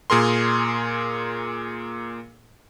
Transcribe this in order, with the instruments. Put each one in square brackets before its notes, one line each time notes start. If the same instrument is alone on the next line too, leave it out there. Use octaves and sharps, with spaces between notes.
[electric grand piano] A#2 G#4 A#4 C6